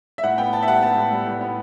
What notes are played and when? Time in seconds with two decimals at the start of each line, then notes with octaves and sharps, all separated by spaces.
0.18 E5
0.23 A2 F#5
0.38 B3 G5
0.53 B3 A5
0.62 E5
0.67 G3 F#5
0.83 B3 A5
0.97 A2
1.12 G3
1.26 A2
1.41 B3